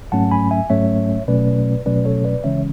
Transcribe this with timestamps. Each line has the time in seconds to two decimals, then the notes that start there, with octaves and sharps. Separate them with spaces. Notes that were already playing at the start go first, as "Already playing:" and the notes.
0.12 G#2 F#3 A3 C#4 F#5 A5
0.31 G#5 B5
0.51 E5 G#5
0.70 G#2 F#3 A3 C#4 C#5 E5
1.28 B2 F#3 A3 C#4 B4 D5
1.86 B2 F#3 A3 C#4 B4 D5
2.05 A4 C#5
2.24 B4 D5
2.44 C#3 E3 G#3 C#4 C#5 E5